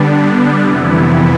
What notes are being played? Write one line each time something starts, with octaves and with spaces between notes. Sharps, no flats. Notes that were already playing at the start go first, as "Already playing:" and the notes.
Already playing: D3 G3 B3 D4
F2 C3 E3 B3 E4